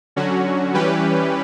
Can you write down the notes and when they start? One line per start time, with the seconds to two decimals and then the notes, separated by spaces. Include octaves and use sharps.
0.16 D3 F#3 C#4 F#4
0.74 E3 G3 C#4 G4 B4